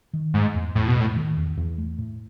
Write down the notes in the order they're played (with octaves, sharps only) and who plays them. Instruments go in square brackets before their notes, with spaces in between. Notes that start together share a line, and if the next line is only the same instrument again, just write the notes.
[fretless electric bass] D#3
[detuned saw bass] G#2 [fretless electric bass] A3
[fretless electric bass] E2
[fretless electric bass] E2 [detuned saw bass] A2
[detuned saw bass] B2
[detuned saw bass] A2 [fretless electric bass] A3
[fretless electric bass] D#3
E2
E2
A3
A2